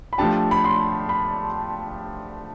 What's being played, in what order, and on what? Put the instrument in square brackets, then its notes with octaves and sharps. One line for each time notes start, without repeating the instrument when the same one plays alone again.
[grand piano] B5
[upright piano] F3 A3 D4 G4 [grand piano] A5
[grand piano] B5
C6
B5